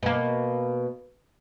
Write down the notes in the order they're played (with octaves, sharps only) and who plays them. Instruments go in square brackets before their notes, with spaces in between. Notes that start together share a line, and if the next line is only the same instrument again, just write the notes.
[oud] B2 A#3